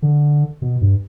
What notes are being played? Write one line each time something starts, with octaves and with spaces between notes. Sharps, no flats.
D3
B2
G2